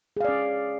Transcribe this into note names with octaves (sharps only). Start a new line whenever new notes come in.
C#4 G#4 D5 F5